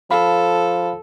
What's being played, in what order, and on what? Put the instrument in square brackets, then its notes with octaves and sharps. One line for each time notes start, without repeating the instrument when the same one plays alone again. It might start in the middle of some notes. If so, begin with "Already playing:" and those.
[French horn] F3 [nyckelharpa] A4 [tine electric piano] F5 B5